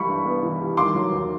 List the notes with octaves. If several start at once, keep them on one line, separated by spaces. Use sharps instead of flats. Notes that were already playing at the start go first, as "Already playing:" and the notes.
Already playing: E3 G3 B5 C#6
G2
B3
E3
G3
D#3 C6 D6
F#3
D#2